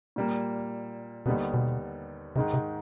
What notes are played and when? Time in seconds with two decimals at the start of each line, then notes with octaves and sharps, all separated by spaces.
0.16 A#2 G3 A#3
1.26 D#2 B2 D3 G3 B3 D#4
1.54 B2
2.36 G#2 C3 D#3 G#3
2.54 C3